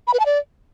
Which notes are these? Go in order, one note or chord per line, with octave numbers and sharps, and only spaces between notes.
B5
B4
A5
D5